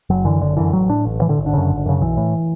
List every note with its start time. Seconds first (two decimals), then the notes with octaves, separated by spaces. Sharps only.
0.10 F#1 F#3
0.25 F#2 D3 E3
0.41 F#1 D3
0.57 F#2 D3 E3
0.73 A1 F#3
0.89 A2 D4
1.05 A1
1.21 A2 E3
1.29 D3
1.38 G#1
1.46 D3
1.53 F#2 C#3
1.69 G#1
1.86 F#2 C#3
2.01 B1 E3
2.17 A2